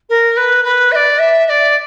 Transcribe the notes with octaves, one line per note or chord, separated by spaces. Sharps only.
A#4
B4
B4
E5
D5
E5
E5
D5